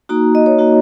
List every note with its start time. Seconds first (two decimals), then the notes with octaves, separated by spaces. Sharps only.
0.09 A#3 D#4 F#4 A#5
0.35 D#5
0.46 C#5
0.59 A#3 D#4 F#4